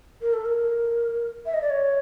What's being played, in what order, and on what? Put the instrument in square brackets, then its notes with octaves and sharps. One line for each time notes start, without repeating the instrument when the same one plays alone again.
[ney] A#4
A4
A#4
E5
D#5
D5
C#5